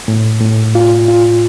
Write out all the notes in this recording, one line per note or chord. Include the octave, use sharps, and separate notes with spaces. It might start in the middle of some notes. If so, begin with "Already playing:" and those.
A2
A2
F4
F4